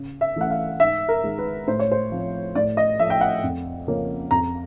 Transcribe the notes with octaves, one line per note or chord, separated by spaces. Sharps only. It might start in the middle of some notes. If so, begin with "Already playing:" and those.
Already playing: C#3
E5
E3 A3 C#4 F#5
F5
G#2 E5
A#4
D#3 G#3
B4
A2 C5
C#5
C5
F3 A3 C4
A2 D5
D#5
F3 A3 E5
G5
F#5
F2
C#3 F3 A#3 C#4
F2 A#5